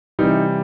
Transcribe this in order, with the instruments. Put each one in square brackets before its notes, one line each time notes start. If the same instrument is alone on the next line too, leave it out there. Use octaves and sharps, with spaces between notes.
[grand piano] C3 E3 G3 D#4